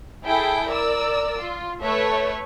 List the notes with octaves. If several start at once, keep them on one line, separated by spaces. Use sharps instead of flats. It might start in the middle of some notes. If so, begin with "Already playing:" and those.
E4 G#4 A4 G5
A#4 D5 E6
F4
A3 B4 C#5 E5